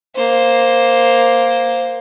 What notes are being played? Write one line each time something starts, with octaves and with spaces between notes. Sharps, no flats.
A#3 C5